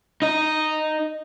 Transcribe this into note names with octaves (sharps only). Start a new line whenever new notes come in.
D#4 D#5